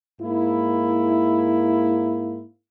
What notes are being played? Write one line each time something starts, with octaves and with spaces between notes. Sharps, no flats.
G#2 A#3 E4